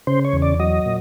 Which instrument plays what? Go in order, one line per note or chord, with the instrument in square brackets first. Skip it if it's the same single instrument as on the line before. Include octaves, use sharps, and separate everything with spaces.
[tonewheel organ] C#3 C5
C#5
E2
D5
F#3 D#5
A#2